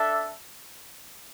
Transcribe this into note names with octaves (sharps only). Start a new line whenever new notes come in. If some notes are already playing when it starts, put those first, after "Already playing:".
Already playing: D4 A4 E5